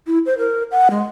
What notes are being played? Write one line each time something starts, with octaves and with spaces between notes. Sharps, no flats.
E4
C5
A#4
F#5
G#3